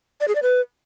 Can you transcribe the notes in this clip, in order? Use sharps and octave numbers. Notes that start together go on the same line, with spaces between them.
D5
G#4
D5
B4